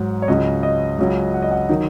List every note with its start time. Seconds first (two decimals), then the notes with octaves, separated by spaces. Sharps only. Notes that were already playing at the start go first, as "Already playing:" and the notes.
Already playing: G#2 F#3
0.22 C#5
0.28 C#2 C#3 F#3 D#5
0.63 D#5
0.98 C#2 C#3 F#3
1.34 F#5
1.42 D#5
1.51 F#5
1.69 D#3 F#3 D#4